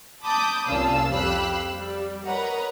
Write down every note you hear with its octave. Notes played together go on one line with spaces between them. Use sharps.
A5 B5 D6 D#6 G6
C2 A#2 C#4 F5 A5 E6
F2 G4 F5 B5 E6 F#6
G3
A#4 B4 C#5 D#5 F#5 A#5